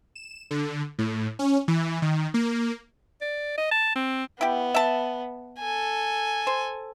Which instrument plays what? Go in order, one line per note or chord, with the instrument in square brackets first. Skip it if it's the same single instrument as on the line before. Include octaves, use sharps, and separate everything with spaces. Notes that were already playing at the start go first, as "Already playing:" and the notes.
[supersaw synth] E7
D3
A2
C#4
E3
D#3
A#3
[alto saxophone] D5
D#5
A5
C4
[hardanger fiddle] B3 [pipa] E4 G4
[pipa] E5 A5
[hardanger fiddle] A4 G#5
[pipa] C5